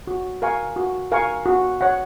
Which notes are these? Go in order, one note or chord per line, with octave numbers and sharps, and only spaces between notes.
F#4
A#4 F5 G#5 C#6
F#4
A#4 F5 G#5 C#6
F#4
C#5 F#5